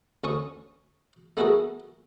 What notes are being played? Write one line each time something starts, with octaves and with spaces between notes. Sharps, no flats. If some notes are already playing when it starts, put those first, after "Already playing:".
D2 C#4 C#6 D#6
A3 B3 E4 F#4 G#4 A#4